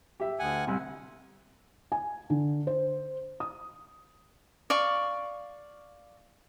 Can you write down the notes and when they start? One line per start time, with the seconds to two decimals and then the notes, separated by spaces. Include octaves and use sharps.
0.20 G4 E5
0.39 D2 F#5 G#5
0.67 C2 C3
1.92 G#5
2.30 D3
2.67 C5
3.40 D#6
4.70 D5 F5 C#6